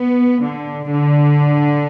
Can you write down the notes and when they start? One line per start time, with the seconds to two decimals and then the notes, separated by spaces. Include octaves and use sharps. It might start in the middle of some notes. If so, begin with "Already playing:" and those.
Already playing: B3
0.41 D3
0.89 D3